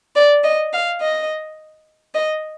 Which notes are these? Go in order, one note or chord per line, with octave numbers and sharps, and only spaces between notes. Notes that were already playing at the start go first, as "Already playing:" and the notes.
D5
D#5
F5
D#5
D#5